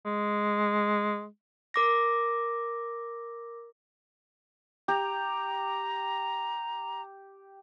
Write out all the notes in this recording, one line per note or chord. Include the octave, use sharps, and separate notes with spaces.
G#3
A#4 D6 A#6
G4 A#5